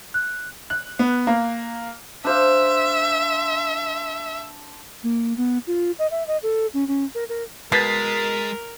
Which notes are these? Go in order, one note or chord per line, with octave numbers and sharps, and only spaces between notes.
F#6
F#6
B3
A#3
D4 C5 E5 F5
A#3
B3
F4
D#5
E5
D#5
A4
C#4
C#4
A#4
A#4
B2 G#3 A#4 A6 B6 C7